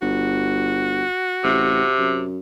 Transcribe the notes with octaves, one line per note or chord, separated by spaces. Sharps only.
G1 F#4
A1 C3
F#2